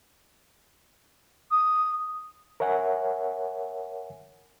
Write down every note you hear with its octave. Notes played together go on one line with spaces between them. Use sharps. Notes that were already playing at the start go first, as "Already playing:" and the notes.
D#6
A#4 C#5 E5 F#5 G#5